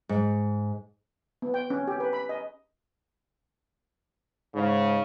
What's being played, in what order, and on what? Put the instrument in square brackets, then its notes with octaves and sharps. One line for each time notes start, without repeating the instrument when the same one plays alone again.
[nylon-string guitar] G#2
[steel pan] B3
G5
C#4
G4
B4
B5
D#5
[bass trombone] G#2 [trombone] C#3